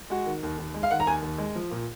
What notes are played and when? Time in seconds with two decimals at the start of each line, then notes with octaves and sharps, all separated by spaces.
0.10 G#3 F#4
0.26 D#3
0.43 D#2
0.58 D#2
0.74 G#3
0.83 F5
0.91 D#3 F#5
1.00 A#5
1.07 D#2 G#5
1.22 D#2
1.38 G#3
1.56 F3
1.72 A#2